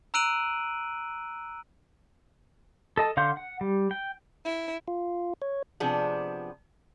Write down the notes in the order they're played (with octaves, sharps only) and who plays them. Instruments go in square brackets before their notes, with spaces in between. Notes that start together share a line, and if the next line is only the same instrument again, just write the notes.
[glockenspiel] A#5 E6 F#6 D7 D#7 F#7
[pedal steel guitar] A4 D#5 A5
D3 F5 F#5 C6 G6
F#5
G3
G5
[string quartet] E4
[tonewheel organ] F4
C#5
[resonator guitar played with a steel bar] C3 F3 B3 D4 G#4